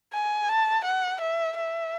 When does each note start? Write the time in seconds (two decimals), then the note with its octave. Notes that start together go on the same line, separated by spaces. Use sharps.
0.13 G#5
0.48 A5
0.85 F#5
1.21 E5
1.58 E5